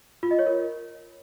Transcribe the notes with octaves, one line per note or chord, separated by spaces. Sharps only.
F4
D#5
C#5
A#4